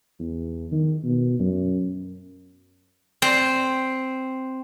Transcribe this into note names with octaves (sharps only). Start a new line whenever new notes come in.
E2
D#3
B2
F#2
C4